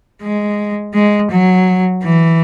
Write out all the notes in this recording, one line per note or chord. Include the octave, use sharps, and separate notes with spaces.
G#3
G#3
F#3
E3